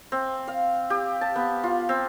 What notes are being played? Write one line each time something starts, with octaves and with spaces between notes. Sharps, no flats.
C4
F5
G4
A5
B3
F4
C4